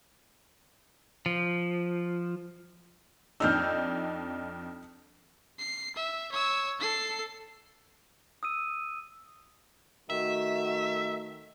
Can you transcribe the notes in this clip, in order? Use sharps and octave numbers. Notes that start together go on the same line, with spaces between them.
F3
F2 D4 D#4 E6 F6 G6
C7
E5
C#5 E6
A4 C7
D#6 E6 D#7
D#3 A3 F#4 E5